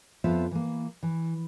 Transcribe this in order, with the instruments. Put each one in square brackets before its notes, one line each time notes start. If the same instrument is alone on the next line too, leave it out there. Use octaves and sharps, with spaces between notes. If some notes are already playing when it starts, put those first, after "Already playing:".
[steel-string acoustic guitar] F2 B3 F4 C5 E5
E3 A#3
E3